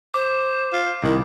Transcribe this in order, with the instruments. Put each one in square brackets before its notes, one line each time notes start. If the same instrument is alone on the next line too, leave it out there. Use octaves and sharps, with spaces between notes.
[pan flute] C5 [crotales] D6
[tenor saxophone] F4
[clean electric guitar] C2 [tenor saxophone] D#3 [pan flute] E4